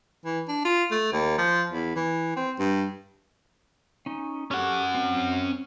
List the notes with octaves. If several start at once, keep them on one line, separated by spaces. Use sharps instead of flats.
E3
D4
F4
A3
D#2
F3
E2
E3
C4
G2
C#4 D#4
C#4 G4 A4 F#5 C#6
C4